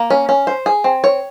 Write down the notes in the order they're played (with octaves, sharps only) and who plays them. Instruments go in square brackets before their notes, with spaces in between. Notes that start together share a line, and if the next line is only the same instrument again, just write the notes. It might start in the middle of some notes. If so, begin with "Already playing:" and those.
Already playing: [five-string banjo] A#3
C#4
C#4
C5
G#4
C4
C#5